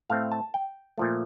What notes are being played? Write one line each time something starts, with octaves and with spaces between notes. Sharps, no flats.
A2 A3 C4 F5
A5
G5
A#2 F3 A3